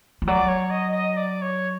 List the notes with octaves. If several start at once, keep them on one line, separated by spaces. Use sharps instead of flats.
F3
F#3 D5
C#5
D#5
D#5
D#5
D5
C#5